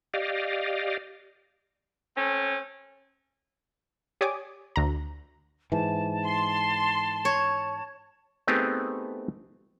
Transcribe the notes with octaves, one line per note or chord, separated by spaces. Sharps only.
G4 D5 D#5 F5
A3 C4 C#4
G4 C#5 D5 G#5 D6 D#6
D2 A#5
G#2 E3 A5
C6
C#5
A3 B3 C4 D#4 G4 G#4